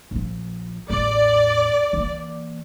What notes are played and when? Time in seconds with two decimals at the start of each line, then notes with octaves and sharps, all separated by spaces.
0.11 A#1 F3
0.90 A1 E2 D5
1.93 E3 A#3